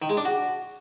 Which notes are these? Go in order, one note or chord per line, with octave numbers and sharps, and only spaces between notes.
D#3
G#3
D4
F#4